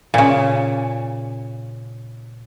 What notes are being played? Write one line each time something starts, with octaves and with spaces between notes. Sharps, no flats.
A#2 C#3